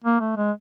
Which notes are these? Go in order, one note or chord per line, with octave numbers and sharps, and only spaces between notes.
A#3
A3
G#3